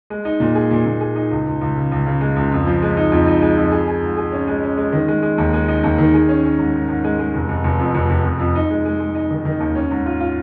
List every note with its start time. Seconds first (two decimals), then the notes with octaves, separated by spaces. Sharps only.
0.10 G#3
0.25 D#4
0.40 A#2
0.55 G#4
0.71 A#2
0.86 A#2
1.01 G#4
1.15 D#4
1.31 C#2
1.46 C#2
1.61 C#2
1.76 C#3
1.92 C#2
2.06 C#3
2.21 G#3
2.36 C#2
2.52 F2
2.67 F3
2.82 G#3
2.97 D#4
3.12 F2
3.27 D#4
3.42 G#3
3.57 F2
3.72 G#4
3.87 G#4
4.02 G#2
4.17 G#4
4.32 C#4
4.47 G#3
4.63 C#4
4.78 G#3
4.93 D#3
5.08 G#3
5.23 G#3
5.38 D#2
5.53 G#3
5.68 D#4
5.83 D#2
5.98 D#3
6.14 G#4
6.29 C#4
6.44 C#4
6.59 G#2
6.74 G#2
6.89 G#2
7.04 G#3
7.19 G#3
7.34 F1
7.49 F1
7.64 F1
7.79 F2
7.95 F1
8.10 F1
8.25 F1
8.39 F2
8.55 D#4
8.70 G#3
8.85 G#3
9.00 G#3
9.15 D#4
9.31 D#3
9.45 D#3
9.60 D#2
9.75 C#4
9.91 G#2
10.06 F4
10.20 F4